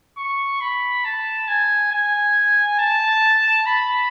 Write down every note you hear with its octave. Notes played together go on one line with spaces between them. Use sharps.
C#6
B5
A5
G#5
G#5
A5
B5